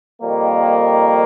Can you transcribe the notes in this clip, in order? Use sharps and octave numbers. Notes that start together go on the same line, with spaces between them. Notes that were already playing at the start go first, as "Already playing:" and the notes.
F2 D#3 G3 A#3